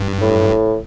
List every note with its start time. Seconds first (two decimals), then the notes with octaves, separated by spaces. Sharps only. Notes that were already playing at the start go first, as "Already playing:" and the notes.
Already playing: G2
0.21 A2